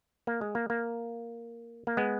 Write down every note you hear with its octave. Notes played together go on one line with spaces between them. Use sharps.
A#3
G#3
A#3
A#3
A#3
G#3 B3